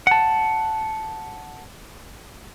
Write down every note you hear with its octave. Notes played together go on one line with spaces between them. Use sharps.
F#5 A5